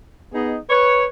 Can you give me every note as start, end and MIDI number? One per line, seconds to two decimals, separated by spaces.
0.33 0.57 59
0.33 0.57 63
0.33 0.57 68
0.33 0.57 75
0.69 1.05 71
0.69 1.05 73